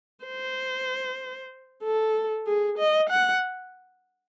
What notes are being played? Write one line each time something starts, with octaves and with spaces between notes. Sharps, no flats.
C5
A4
G#4
D#5
F#5